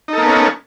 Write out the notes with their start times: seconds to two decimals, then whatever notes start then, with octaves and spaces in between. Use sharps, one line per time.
0.08 D#4
0.13 A4
0.18 A#3
0.22 B3
0.27 C#4